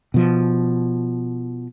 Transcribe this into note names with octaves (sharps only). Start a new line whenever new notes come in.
B2 F3